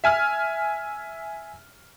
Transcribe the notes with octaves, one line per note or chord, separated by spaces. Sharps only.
E5 G#5 F6